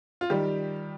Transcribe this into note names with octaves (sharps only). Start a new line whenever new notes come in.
F4
D#3 G3 G4